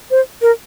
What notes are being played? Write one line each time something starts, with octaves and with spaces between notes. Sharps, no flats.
C5
A#4